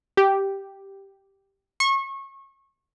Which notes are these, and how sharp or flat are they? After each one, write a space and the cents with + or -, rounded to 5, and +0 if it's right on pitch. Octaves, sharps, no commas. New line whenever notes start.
G4 -5
C#6 -30